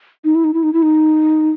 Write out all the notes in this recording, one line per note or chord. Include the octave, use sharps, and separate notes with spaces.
D#4
E4
D#4
E4
D#4
E4
D#4